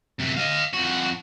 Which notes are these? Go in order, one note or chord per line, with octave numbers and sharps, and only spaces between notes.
F#2 C3
D#5 F5
F2 F#4